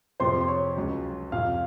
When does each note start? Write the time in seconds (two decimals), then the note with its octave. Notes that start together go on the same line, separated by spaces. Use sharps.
0.20 F2 C3 F3 C5 C6
0.41 C6
0.48 C#5 C#6
0.77 C#2 C#3 F#3
1.32 F2 C3 F3 F5 F6